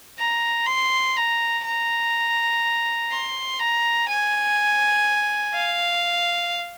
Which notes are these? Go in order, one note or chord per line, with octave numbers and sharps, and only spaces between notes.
A#5
C6
A#5
A#5
C6
A#5
G#5
F5